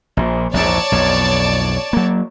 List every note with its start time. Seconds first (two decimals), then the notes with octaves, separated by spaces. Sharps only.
0.17 A#1 A#2
0.54 A#1 E2 G#2 C#5 D5 A5
0.92 B1 F2
1.93 F#3 A#3